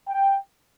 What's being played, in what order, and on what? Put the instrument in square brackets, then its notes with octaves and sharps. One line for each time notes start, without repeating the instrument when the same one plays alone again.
[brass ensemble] G5